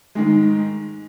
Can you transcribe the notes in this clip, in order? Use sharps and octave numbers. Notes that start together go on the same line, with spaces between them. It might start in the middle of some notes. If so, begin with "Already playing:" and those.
G#2 D#3 G#3